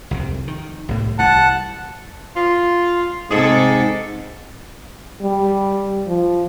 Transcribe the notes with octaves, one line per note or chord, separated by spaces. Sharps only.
C2 F2 C3
D#3
C2 A2
C2 E3 G3 F#5 A5
F4
G#2 C3 G#4 A4
G3
F3